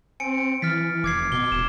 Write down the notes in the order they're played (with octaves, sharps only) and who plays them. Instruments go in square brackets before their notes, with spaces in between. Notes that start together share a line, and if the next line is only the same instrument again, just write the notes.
[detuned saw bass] C4 [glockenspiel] G#5 C#7 D7
[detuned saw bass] E3 [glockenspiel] F6 A6 B6
[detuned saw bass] F1 [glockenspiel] D6 G#6 C7
[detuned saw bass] B2 [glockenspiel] D6 G7
[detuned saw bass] E1 [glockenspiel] E7